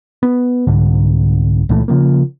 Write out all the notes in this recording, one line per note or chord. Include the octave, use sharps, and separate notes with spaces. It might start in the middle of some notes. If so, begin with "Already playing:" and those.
B3
C2 G#2 D3
C#2 A#2 E3 A3
C#3 F3 A#3